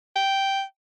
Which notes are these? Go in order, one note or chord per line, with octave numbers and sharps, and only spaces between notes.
G5